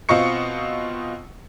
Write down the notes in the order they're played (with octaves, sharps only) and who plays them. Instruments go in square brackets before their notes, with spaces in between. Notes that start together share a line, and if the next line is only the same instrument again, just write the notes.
[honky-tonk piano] B2 C4 F4 D#5 C#6 C#7